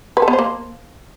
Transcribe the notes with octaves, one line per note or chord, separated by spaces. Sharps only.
B4
A4
B3
C5
A#3